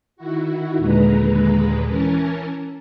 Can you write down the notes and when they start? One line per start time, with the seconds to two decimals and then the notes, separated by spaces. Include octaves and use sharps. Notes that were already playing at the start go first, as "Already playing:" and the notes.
0.17 D#3 E4 F#4
0.77 D#2 A#2 D3 G#3 B4 A#5
1.86 E3 C#4 A#4 G#5 A5